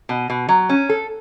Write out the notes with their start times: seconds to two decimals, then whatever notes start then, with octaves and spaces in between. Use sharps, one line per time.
0.09 B2
0.30 B2
0.49 F#3
0.69 C#4
0.89 A4